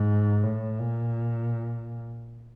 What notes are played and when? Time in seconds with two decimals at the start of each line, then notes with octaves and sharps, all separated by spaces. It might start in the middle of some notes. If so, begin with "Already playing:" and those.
Already playing: G#2
0.43 A2
0.79 A#2